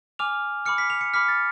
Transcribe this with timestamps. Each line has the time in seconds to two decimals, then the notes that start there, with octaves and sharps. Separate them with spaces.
0.19 G#5 D6 F6 F7
0.66 B5 D6 F6 C#7
0.78 B6
0.90 F7
1.01 C#7
1.14 B5 D6 F6 B6
1.28 A6